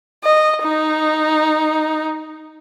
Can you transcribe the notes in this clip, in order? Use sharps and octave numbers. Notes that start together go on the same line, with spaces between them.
D#5
D#4